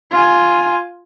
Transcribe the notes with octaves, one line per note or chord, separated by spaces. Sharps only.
F4 G#5